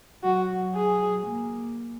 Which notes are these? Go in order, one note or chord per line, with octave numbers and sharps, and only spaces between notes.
F#3 F#4
G#4
A#3